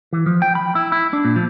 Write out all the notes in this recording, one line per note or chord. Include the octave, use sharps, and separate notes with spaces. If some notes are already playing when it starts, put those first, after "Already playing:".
E3
F3
G5
B5
E4
E4
D4
A#2
F3